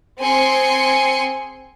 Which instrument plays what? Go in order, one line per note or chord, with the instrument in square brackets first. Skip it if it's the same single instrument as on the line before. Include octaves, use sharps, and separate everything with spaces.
[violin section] C4 G#4 G#5 C6 C#7